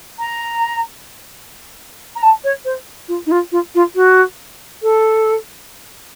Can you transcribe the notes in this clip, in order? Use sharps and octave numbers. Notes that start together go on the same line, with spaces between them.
A#5
A#5
A5
C#5
C5
F4
D#4
F4
F4
F4
F#4
A4